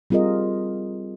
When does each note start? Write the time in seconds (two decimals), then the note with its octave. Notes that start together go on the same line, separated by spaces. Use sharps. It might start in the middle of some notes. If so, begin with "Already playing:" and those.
0.10 G3 C4 F4 G#4 A#4 D#5